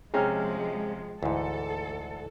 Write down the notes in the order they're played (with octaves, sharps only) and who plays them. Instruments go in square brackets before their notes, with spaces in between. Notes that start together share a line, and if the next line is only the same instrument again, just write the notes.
[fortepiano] C3 C#4 A#5 [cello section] F3 G#3 [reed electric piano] G#4 G5 F6
[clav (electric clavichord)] D2 G#2 [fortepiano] E3 [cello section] A4